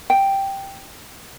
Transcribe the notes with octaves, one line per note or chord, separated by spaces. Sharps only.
G5